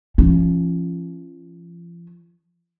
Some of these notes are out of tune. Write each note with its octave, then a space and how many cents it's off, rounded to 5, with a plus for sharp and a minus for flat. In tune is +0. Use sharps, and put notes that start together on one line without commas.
F3 -35 C#4 -20